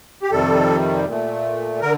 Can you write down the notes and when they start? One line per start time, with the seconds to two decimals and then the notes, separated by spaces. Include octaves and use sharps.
0.22 G4
0.31 F2 C3 D#3 G3 A4
1.06 A#2 A3
1.81 D3 A#4